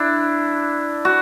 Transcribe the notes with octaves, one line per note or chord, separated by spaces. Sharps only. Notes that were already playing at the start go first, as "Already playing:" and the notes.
Already playing: D4 E4
F#4